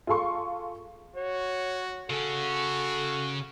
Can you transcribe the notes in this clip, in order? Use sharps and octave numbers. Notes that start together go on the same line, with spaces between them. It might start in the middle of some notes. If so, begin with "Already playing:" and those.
F4 G#4 A4 C6 C#6
F#4 C#5
C#3 C#4 F#4 A4